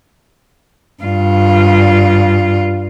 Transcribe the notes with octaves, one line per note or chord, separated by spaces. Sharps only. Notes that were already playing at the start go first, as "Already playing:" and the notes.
G2 F4